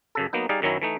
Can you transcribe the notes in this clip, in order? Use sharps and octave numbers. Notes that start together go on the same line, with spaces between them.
F#2 C#3 A4
F#3 A#3 B3 D#4
G3 D#4 G#4 D5 F5
F#2 D#3 F#3 C#4 E4
E3 A3 D#4